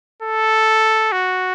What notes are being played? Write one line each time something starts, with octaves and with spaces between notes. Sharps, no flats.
A4
F#4